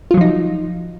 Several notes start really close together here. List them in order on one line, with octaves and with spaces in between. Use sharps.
F4 F#3 F3 D#4